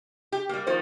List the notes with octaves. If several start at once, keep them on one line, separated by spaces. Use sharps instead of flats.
G4
G3 A#3
D#3 F3 A#3 C5